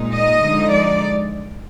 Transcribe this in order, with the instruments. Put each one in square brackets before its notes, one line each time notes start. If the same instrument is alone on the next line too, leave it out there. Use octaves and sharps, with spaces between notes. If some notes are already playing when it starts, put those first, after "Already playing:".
Already playing: [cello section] A#2 G#3 D#4
D#5
D3 F3 G#3 D#4
D5